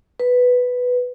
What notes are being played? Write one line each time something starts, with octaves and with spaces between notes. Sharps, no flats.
B4